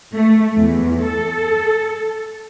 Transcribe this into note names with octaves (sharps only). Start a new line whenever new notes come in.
A3
E2
A4